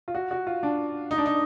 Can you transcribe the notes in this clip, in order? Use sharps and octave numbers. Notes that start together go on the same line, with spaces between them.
F4
F#4
F#4
F4
D4
D#4
D4
D#4